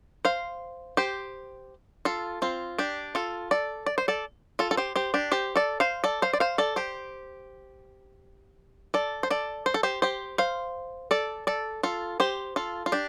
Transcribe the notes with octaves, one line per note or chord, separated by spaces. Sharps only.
C5 F5
G4 C5
F4 A4
C4 F4
D4 G4
F4 A4
A4 D5
D5
C5
A4 D5
F4 A4
A4
G4 C5
G4 C5
D4 G4
G4 C5
A4 D5
C5 F5
A4 D5
C5 F5
D5
C5 F5
A4 D5
G4 C5
A4 D5
C5
A4 D5
C5
A4
G4 C5
G4 C5
C5 F5
A4 D5
A4 D5
F4 A4
G4 C5
F4 A4
F4
D4 G4